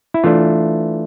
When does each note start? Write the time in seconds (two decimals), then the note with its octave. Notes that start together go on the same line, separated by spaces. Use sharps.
0.14 E4
0.24 E3 A3 D4 F4